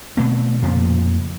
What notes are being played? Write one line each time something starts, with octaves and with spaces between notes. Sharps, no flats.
B2 A3 C4
F2 A#2 C#3 F3